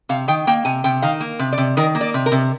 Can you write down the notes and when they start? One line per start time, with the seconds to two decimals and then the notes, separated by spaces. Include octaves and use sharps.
0.09 C3 F5
0.28 D#3 G5
0.47 A#3 G5
0.65 C3 G#5
0.84 C3 G5
1.02 D#3 F5
1.21 A#3
1.39 C3
1.53 D5
1.58 C3
1.77 D#3 A#4
1.95 A#3
2.01 D5
2.14 C3
2.26 A#4
2.32 C3